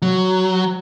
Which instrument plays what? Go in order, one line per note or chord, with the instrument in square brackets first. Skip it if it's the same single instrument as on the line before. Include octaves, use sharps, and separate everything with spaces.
[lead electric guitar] F#3